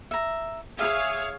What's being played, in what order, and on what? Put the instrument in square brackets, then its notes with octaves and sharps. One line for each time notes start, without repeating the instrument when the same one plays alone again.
[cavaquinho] E5 A#5
[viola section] G#4 C#5 F5 [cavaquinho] E5